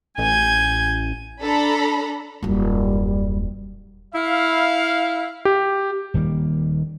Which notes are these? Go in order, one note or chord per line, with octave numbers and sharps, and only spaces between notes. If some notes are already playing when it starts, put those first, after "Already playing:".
A1 G#5 G6 G#6
D4 A4 A#5 B5
D#1 F#2 G3
E4 F5
G4
D#1 D#3 G3 A#3